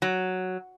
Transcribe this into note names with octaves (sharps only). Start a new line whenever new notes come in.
F#3